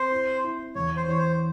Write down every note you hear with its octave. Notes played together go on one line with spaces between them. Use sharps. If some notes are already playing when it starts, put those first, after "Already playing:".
Already playing: C4 C5
E4
E4
E2 C#5
C5
E3 C#5
C5